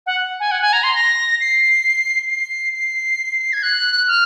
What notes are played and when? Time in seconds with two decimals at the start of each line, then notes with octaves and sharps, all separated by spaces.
0.06 F#5
0.40 G#5
0.51 F#5
0.62 G#5
0.73 A#5
0.83 C6
0.95 A#6
1.40 C7
2.29 C7
2.73 C7
3.53 G#6
3.63 F#6
4.08 F6